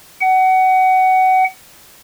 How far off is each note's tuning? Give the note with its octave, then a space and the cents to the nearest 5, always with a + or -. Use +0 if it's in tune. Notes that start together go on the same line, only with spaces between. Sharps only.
F#5 +25